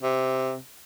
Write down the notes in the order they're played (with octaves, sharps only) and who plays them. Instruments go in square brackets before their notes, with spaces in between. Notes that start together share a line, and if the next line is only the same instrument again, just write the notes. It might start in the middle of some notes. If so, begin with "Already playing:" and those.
[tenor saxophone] C3